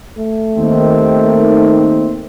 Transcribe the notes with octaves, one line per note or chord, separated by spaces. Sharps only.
A3
D#2 D#3 C4